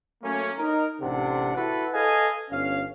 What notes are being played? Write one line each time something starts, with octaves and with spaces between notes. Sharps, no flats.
F#3 A3 A#3 C#4
D#4 A#4
A1 C3 D4 F#5
E4 F#4 A4 B4
A4 B4 D#5 F5 G#5
G1 C#4 F5